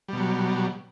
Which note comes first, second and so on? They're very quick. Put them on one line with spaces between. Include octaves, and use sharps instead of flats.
G3 B2 F#3